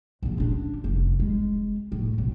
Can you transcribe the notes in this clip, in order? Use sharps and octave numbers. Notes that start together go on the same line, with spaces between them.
A#1 D3
C#4 D4
F1
G#3
A2
B1 F#2